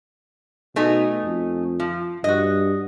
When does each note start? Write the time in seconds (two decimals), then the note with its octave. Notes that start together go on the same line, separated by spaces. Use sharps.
0.76 B2 A3 D#4 G#4
1.24 F2
1.80 F3
2.24 G2 F#4 D#5